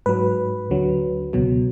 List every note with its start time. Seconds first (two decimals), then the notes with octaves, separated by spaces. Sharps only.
0.06 G#2 F#3 B4
0.70 D2 D3 F#3
1.33 C#2 B2 F#3